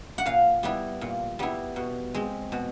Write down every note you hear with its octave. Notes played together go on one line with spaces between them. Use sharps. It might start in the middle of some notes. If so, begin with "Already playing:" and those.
F#5
A#2 F5
G3 B3 E4
A#2
G3 B3 E4
B2
G#3 C4
B2